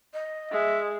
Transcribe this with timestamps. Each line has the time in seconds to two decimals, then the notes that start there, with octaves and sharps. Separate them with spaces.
0.14 D#5
0.51 G#3 E5